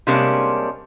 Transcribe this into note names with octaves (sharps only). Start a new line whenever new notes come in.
C3 G3 G#3 A#3 C#4 D4